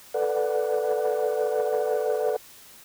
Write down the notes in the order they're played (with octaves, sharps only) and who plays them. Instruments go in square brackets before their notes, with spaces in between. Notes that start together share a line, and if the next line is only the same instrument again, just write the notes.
[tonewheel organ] A4 B4 D5 F#5